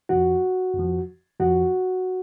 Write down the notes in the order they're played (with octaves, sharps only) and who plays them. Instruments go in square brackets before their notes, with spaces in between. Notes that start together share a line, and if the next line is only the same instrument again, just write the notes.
[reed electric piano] F2 F3 F#4
F2 F3
F2 F3 F#4